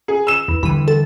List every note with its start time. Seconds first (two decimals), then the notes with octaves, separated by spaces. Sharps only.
0.08 G#4
0.27 E6 E7
0.48 E2
0.63 D3 E3 G3 B5 D#7
0.88 A4